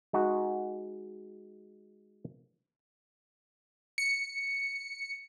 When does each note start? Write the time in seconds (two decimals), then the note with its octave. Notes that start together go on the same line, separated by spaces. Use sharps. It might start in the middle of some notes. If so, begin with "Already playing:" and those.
0.13 G#3 D#4 F#4
3.98 C#7